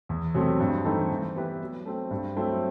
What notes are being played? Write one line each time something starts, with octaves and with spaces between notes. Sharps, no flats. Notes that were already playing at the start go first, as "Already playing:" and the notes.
E2
C3 F#3 A3 C4
G2
E3 A3 C4 D#4
E3
B3 E4 G4 B4
F#3
A3 C4
G2
F#3 A3 C4 E4